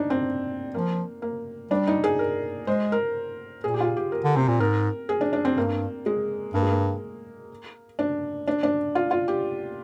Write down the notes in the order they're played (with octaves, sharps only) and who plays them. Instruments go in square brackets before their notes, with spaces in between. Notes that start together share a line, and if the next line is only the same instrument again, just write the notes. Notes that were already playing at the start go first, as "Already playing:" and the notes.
Already playing: [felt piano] D4 D#4
C4
[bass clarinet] F3 [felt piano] A#3
[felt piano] A#3
[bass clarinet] G3 [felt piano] D4
[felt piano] D#4
G#4
A#4
[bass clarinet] G#3 [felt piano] C5
[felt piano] A#4
[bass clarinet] A#2 [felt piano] G#4
[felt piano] G4
F4
G4
A#4
[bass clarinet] D3
[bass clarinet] C3 [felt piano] C4
[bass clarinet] A#2
[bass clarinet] G#2 [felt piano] A#4
[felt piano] G#4
D4
D4
C4
[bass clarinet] G2 [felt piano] A#3
[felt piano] G#3
[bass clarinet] G2 [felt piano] A#3
[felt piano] G#3
A#3
D4
D4
D4
F4
F4
G4